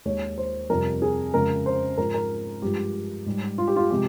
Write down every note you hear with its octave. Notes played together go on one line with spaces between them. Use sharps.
D#2 D#3 G#3 C#5
C5
F2 C3 G3 A#4
G#4
F2 C#3 G#3 A#4
C5
G#2 F3 G#3 A#4
A#4
G2 F3 G#3 G4
G#2 G3
F4
G4
F4
C3 F3 G#3 G4